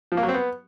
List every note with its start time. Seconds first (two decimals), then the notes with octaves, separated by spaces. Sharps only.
0.12 F3
0.17 A#3
0.23 F#3
0.29 C4
0.34 B3